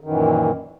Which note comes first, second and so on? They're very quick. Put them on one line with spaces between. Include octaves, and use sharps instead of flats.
D#3 F#2 E3 A#2